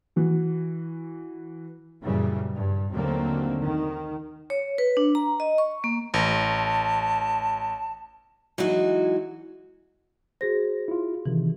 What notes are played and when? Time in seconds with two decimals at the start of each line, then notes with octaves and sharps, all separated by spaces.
0.16 E3 F#4
2.03 F#2 A#2 C#3 E3 G3
2.55 G2
2.92 D#2 D3 F#3 A3 A#3 C4
3.61 D#3
4.50 C#5
4.78 B4
4.97 D4
5.15 A#5
5.40 D#5
5.58 C#6
5.84 A#3
6.14 A1 A5
8.58 E3 F#3 G#3 D#4 F#4
10.41 F#4 G#4 C5 A#6
10.88 E4 F4
11.26 C3 D#3 E3